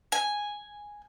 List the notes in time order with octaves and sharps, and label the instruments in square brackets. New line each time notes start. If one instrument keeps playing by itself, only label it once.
[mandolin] G#5